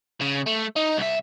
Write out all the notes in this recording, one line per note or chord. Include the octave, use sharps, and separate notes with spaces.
C#3
A3
D#4
C2 E5